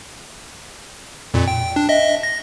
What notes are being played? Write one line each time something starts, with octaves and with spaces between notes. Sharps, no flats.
F2 A#2
G5
D4
D#5 E5
A#6